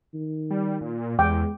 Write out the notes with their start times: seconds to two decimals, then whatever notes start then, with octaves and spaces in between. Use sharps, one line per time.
0.14 D#3
0.51 G3
0.81 A#2
1.19 E2 G#3 G5 D6